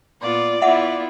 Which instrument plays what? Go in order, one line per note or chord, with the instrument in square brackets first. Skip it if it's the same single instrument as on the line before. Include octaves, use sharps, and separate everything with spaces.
[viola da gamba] A#2 B3 F4 [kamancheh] D5
[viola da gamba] B3 E4 F4 [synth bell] E5 F#5